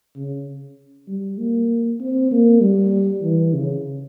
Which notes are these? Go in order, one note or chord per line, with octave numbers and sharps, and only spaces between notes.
C#3
G3
A#3
C4
A#3
G3
E3
C#3